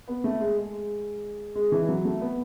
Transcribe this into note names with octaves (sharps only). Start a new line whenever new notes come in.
B3
A3
G#3
G#3
G#3
E3
F#3
A3
B3